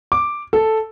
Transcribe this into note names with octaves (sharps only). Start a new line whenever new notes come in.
D6
A4